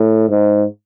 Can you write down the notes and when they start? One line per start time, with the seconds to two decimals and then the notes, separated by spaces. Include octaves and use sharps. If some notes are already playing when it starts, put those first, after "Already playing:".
Already playing: A2
0.29 G#2